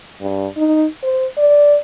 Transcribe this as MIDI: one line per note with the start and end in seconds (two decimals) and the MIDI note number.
0.21 0.47 43
0.57 0.86 63
1.03 1.27 72
1.37 1.78 74